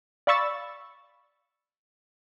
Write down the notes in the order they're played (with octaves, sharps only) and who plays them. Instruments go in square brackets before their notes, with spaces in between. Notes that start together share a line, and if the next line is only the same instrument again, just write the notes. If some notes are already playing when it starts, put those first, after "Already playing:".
[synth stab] D5 F5 B5 C#6 E6 A6